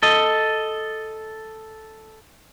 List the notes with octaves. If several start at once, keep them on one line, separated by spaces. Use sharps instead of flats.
A4 D#5